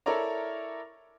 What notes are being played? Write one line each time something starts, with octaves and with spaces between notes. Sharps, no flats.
E4 A4 A#4 C#5 D5 A#5